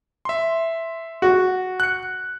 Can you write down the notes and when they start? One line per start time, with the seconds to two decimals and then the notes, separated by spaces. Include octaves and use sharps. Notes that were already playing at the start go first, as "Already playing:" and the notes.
0.25 E5 C6
1.22 F#4
1.80 F#6 C#7